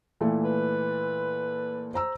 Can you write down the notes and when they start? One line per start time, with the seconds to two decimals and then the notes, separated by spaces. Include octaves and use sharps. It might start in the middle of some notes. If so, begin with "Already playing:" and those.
0.21 A#2 E3 A3
0.44 B4
1.94 C5 A#5 E6